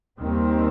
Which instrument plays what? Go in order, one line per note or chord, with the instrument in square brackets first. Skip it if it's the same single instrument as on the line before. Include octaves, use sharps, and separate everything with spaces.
[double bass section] D#2 D#3 G3 C4